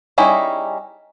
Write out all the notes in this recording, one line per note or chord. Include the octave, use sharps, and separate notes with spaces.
G3 C#4 D#4 E4 G#4